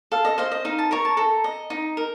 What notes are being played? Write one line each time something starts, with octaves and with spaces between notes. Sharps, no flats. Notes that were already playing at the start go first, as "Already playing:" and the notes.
A4 F5
D#5
C5 D#5 F5
D#5
D#4 F5
A5
A#4 C#5 A#5
A5
A4 A#5
D#5
D#4
A#4